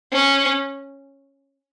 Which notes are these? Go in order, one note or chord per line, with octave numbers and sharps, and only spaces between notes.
C#4